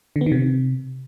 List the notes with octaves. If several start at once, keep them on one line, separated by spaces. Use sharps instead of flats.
D3
B3
D#3
C3